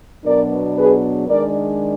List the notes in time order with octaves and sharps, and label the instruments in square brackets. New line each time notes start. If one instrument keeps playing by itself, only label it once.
[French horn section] B2 F#3 B3 D4 A#4 D5
G#4 B4
D#3 G#3 D4 A#4 D5